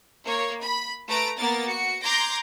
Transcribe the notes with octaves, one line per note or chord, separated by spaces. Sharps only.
A#3 C#5
B5
A3 B4 A#5 A6 D7
A#3 B3 A#4 A6
F#4 C#7
A#5 C6 D6 G6 G#6 A#6